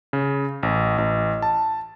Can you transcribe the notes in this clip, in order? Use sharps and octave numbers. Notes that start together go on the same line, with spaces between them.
C#3
A1
A1
A5